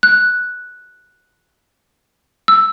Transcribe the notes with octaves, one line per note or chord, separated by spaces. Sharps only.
F#6
E6